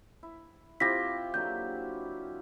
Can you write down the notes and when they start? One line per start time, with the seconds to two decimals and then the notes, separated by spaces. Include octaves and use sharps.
0.23 E4
0.80 C4 E4 F4 G4 A#6 B6
1.34 D3 F#3 A#3 G6